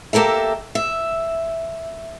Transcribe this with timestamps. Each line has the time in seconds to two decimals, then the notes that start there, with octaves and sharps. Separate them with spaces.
0.13 A#3 G4 A4 A#4 E5
0.75 E5